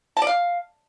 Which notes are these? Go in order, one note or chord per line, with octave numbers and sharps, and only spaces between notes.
A5
D5
F5